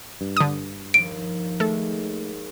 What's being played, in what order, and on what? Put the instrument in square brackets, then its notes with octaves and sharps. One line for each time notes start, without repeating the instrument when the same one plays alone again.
[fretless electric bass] G2
[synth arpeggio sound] D3 D#6
[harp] D#2 F3 [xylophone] D7
[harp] D#2 D#3 G#3 [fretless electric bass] A3 [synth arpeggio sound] A4